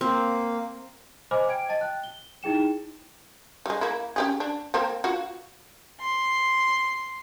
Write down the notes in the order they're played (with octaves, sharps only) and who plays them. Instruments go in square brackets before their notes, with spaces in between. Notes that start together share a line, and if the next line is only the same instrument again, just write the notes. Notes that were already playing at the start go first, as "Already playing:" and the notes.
[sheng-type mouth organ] A#3 [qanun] C4
[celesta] C5 D#5 G#5 B5 D6 F6
G5 G#6 D7
D#5 A5 A6
G5 F#6
G7
D#4 E4 G#4 G5 E7
[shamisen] G3 G#3
A#3 E4
C#4 G4 G#4
D4
A#3 C4 A#4
F4 F#4
[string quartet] C6